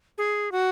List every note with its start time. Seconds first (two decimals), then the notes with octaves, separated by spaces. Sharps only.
0.18 G#4
0.52 F#4